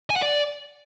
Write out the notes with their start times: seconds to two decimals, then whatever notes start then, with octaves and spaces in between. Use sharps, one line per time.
0.10 G#5
0.16 F#5
0.22 D5